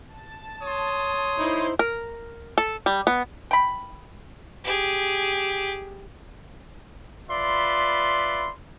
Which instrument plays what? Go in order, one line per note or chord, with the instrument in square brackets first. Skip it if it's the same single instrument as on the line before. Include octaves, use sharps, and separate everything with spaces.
[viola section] A5
[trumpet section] C#5 C6 D#6
[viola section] D#4 E4 C5
[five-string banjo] A#4
A4
G3
B3
[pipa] G5 B5
[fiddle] G4 G#4
[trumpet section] F4 B4 D5 E5 B5 C6